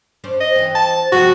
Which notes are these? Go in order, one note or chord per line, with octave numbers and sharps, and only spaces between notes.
C#4 D4 C5
D#5
E3 C4
A5
C3 F3 B3 F#4